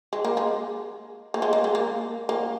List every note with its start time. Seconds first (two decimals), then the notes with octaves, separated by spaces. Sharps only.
0.13 G#3
0.25 A#3
0.37 G#3
1.34 A#3
1.42 G#3
1.53 A#3
1.64 G#3
1.75 A#3
2.29 A#3